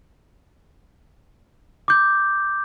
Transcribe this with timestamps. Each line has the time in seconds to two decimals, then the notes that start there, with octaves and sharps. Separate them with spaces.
1.88 D6 G6